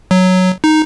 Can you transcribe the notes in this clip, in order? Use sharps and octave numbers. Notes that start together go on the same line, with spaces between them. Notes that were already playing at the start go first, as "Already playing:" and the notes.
F#3
D#4